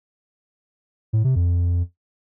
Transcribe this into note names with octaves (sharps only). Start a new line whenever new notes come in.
A2
C3
F2